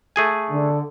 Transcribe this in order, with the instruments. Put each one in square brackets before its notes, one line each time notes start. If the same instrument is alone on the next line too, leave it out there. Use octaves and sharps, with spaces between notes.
[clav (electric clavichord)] A3 G#4 G#5
[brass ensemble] D3